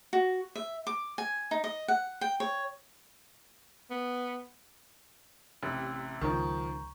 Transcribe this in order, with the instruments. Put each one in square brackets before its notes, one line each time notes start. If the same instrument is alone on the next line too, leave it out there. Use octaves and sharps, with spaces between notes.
[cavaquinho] F#4
E5
D6
G#5
D#4
D#5
F#5
G5
C#5
[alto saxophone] B3
[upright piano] A1 C3 [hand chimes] F6 F#6
[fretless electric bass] C#2 [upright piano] D#3 F3 [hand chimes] A#5 C#6 G6